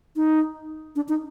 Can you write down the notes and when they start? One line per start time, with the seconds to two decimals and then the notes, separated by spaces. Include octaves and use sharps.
0.16 D#4
0.96 D4
1.09 D#4